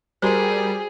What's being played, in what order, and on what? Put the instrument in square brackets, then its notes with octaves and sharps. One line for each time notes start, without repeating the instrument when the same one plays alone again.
[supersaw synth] G3 [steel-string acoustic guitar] A3 A#4 [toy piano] F#4 C5 [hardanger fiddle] G#4